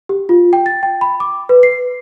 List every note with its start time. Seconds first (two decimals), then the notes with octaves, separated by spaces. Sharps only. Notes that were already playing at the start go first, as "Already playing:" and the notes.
0.09 G4
0.29 F4
0.53 G5
0.66 A6
0.83 G5
1.01 B5
1.20 D6
1.49 B4
1.63 C7